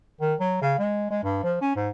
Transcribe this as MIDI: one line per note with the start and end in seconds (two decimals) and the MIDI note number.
0.21 0.34 51
0.40 0.59 54
0.62 0.75 49
0.78 1.09 56
1.10 1.23 56
1.23 1.41 43
1.43 1.59 53
1.61 1.74 61
1.75 1.89 44